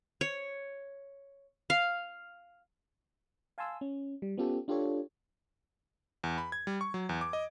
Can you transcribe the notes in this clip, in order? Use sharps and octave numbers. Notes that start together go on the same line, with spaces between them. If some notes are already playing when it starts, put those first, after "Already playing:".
C#5
F5
F5 G#5 A5 C6 E6
C#4
G3
B3 C#4 F4 G4 A4
D4 F4 G4 A4 C#5
E2
B5
G#6
G3
C#6
F#3
E2
D6
D#5